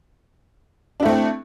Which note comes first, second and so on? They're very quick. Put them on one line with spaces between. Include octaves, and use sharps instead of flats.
D4 E4 A3 C4